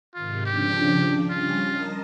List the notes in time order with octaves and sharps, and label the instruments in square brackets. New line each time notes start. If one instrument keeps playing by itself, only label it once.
[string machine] G#2 C3 D#3 [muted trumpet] F4
[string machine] C#3 F3 D4 [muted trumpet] G4
[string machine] G3 C#4 A#6 [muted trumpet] F4
[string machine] A#4 D#5 A5